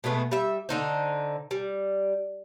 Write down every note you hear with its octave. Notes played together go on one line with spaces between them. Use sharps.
B2 G#3 A3 B3
G3 E5
D3 D#4 C5
G3